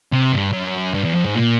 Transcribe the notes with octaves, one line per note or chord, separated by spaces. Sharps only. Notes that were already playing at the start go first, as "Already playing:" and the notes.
C3
G2
F#2
G2
E2
F2
G#2
A#2